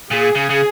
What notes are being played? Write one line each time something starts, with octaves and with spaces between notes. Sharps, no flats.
A#2 G#4
C#3
C#3